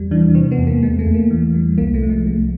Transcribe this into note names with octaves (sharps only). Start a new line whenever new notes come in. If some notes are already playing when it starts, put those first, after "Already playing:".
Already playing: E2 G3
E3 D4
C3 C4
B3
E2
A#3
E2 G#3
A3
E2
A#3
E3
G3
C2 A#3
A3
F3
G#3
C2 A3